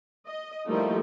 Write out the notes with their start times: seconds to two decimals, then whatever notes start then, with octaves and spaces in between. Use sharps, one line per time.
0.27 D#5
0.67 F3 G3 A3 A#3 D#4 E4